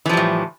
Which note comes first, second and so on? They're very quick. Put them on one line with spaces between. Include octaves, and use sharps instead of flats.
E3 F3 G3 A2